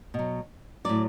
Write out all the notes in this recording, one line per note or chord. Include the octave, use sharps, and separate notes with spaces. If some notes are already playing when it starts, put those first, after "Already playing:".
B2 F#3
A2 F#3 D5